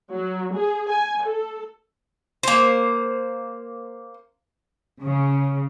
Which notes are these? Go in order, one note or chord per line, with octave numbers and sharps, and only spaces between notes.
F#3
G#4
G#5
A4
A#3 C5
C#3